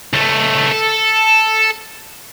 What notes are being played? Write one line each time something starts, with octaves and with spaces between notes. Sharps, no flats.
C#2 A3
A4